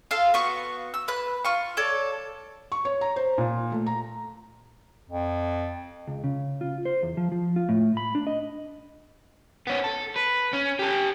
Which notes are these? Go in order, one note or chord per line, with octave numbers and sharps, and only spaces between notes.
F4 A4 F5
B3 F#4 C#6
E6
B4 B5 F#6
F4 C#6
A4 C#5 D5
C#6
C#5
A#5
C5
A#2
A3
A#5
F2
C#2
C#3
F4
C5
E2
F3
F3
F4
A2
B5
D4
D#5
B3 C#4
A4
B4
C#4
G4 A4